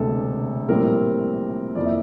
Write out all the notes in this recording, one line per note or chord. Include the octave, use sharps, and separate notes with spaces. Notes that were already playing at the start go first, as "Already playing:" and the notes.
Already playing: E1 D2 C3 A4
A#1 A2 G3 C4 A#4
F2 E3 A#3 D5
E5